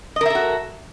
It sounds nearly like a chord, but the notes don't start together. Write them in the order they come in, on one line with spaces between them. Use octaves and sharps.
D#5 A#4 E5 A4 F#4